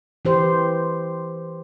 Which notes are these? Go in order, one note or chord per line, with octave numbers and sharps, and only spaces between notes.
E3 G4 C5